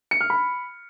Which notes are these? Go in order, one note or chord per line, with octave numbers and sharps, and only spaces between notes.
C#7
F6
B5